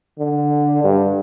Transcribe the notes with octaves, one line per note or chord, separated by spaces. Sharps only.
D3
G2